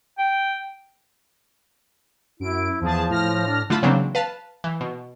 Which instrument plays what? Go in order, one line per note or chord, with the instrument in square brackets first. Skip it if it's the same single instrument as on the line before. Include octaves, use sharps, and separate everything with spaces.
[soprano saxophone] G5
[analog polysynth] F#2 D7 [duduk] E4
[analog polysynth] E2 G#4 A5 [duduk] F3
[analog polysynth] A2 F6 A#6
[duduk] D4
[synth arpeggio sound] D3 A3 F4 E5 A5 B5
C#3 E3 F#3 A#3 C4 D4
B4 F5 A5
E3
B2